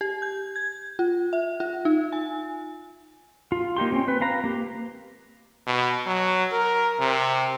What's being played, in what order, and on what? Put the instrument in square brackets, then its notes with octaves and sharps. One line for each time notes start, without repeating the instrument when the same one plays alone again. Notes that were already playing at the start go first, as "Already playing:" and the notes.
[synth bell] G4
G6
G#6
F4
E5
F4
D#4
G#5
[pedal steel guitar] F4
A#3 D#4 G4 C6
C4 C#4
B4
C4 B4 F5 A#5
A#3 G4
[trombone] B2
F#3
A#4
C3